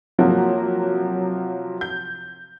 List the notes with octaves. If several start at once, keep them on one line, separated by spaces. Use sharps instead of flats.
C3 F3 F#3 A#3 F#4
G6